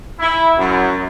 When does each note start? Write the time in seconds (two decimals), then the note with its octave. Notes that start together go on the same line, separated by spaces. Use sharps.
0.19 E4
0.58 F#2